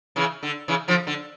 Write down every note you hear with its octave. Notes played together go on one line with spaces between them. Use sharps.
C#3 E3
D3
C#3 E3
D3 F3
D3